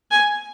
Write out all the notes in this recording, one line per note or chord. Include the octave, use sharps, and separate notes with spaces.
G#5